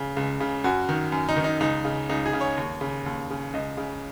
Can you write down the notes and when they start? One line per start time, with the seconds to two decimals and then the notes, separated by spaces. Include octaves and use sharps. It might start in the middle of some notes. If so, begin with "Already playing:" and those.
Already playing: C#3
0.17 C#2
0.40 C#3
0.64 F#2 F#4
0.89 D#3
1.12 F#2
1.29 D#4
1.37 D#3
1.44 D#4
1.60 C#2 D#4
1.85 C#3
2.09 C#2 D#4
2.26 G#4
2.33 C#3
2.41 C#5
2.57 D#2
2.81 C#3
3.06 D#2
3.30 C#3
3.54 C#2 D#5
3.77 C#3